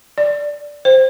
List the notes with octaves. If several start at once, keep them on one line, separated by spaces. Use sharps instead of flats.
D5
C5